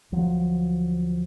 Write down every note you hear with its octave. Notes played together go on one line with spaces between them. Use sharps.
D2 F3 F#3